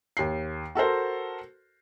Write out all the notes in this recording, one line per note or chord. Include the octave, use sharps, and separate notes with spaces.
D#2 C7
F#4 A4 A#4 C5